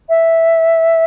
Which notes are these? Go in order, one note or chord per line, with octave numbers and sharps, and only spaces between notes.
E5